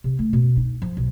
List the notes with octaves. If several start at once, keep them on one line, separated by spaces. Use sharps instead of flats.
C3
A3
B2
D#4
F3
B1